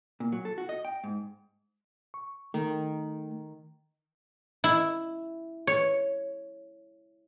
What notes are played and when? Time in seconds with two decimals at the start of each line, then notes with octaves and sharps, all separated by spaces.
0.20 A#2
0.32 F#3
0.45 A4
0.58 F#4
0.69 D#5
0.85 G5
1.04 G#2
2.14 C#6
2.54 D#3 A3
4.64 E4
5.67 C#5